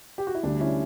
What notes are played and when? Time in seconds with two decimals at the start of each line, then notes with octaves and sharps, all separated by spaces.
0.18 G4
0.27 F#4
0.35 E4
0.43 D2 D3 G3 D4
0.60 C#4 E4